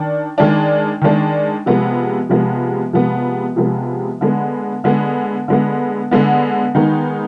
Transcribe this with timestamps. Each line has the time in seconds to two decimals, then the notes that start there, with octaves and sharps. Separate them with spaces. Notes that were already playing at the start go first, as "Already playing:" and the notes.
Already playing: D#3 D4
0.38 D#3 G#3 D4
1.01 D#3 G#3 D4
1.66 C3 F3 G#3 B3
2.29 C3 F3 G#3 B3
2.93 C3 F3 G#3 B3
3.56 C3 F3 G#3 B3
4.21 D3 G#3 B3
4.84 D3 G#3 B3
5.48 D3 G#3 B3
6.11 D3 G#3 B3
6.75 D#3 G#3 B3 D#4